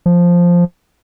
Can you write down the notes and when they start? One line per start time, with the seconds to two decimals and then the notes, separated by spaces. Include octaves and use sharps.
0.06 F3